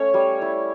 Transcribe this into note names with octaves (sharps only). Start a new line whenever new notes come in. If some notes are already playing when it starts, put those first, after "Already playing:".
Already playing: A3 C#4 C#5
G3
E4